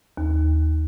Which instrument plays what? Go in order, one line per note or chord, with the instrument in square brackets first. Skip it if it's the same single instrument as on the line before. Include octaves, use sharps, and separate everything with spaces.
[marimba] D#2